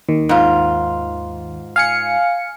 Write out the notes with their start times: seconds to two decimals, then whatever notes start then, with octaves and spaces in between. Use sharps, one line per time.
0.09 D#2 D#3
0.29 G#2 F4
1.76 F5 G#5 C#7